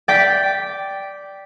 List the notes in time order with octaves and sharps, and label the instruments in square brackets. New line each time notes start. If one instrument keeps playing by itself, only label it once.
[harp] D5 G5 B6